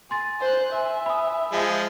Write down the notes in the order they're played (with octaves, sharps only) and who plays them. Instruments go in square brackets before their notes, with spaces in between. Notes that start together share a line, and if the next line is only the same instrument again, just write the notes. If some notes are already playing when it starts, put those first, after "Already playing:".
[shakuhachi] G#5 [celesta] C6 A6
[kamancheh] C5 F#6
[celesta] C5 C6 [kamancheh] E5
[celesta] B5 D#6
[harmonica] F3 G#3